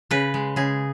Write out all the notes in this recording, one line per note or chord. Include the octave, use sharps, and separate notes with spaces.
C#3 B4
G#3
C#3 G#4